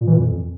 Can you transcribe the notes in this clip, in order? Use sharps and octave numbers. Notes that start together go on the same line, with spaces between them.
A#2
E3
A#2
F2